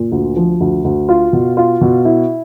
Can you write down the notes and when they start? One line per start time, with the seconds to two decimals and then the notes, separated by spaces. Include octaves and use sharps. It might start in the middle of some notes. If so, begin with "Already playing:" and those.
Already playing: A#2
0.12 D2
0.36 F3
0.60 D2
0.84 D2
1.09 F4
1.33 B2
1.57 F4
1.81 B2
2.05 E4